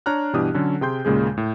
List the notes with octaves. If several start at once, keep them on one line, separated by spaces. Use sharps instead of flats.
D4 C#5 A#5 F6 F#6
G2 B2 E3 D4 G4 D#6
D3 F#3 C#4 A4
C3 G#4 G5 C6 G6
D#2 A#2 C#3 G#3 G#4
A2